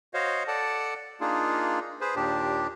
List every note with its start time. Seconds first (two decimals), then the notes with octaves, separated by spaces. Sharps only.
0.14 F#4 C5 C#5 D#5 F5
0.47 A4 D5 F#5 A5
1.21 A#3 D4 D#4 F4 G#4
2.01 G#4 B4 C5
2.16 D#2 A#2 D4 G4